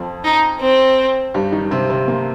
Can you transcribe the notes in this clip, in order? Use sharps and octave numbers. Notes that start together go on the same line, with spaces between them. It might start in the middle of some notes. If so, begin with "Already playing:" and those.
Already playing: F2 F3
D#4
C4
G2 G3
D#3 D#4
C3 C4
C3 C4
A#2 A#3